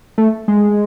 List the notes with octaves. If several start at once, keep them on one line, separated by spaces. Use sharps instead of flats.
A3
G#3